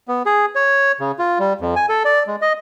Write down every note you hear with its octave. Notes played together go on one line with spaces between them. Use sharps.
B3
G#4
C#5
C#3
F4
G3
F2
G#5
A4
D5
G#3
D#5